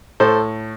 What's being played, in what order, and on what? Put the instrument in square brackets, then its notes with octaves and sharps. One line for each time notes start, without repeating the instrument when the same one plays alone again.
[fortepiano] A2 A4 C5